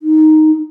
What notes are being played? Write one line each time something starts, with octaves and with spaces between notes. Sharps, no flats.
D#4